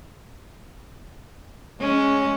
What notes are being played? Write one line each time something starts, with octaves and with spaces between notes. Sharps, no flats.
G#3 C#4